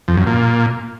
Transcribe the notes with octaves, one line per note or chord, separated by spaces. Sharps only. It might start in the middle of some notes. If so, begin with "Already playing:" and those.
F2
F#2
A#2